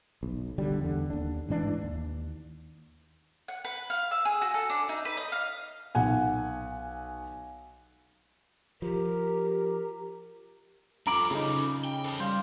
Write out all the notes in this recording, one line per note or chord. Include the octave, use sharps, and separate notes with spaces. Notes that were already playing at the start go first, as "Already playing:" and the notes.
B1
D3 G3
E2 D3
D#2 D4
A1 G#2 E3 D4
D#2
F#5
B4
F5
E6
G#4
F#4
A4
D4
D#4
B4
D#5
F5
B1 F#5 G#5
F3 G4 A#4
C#4 F4 A4 A#5 B5 D6 D7 F#7
C#3 D#4
G5
A4 C5 A5
G3 C5 F5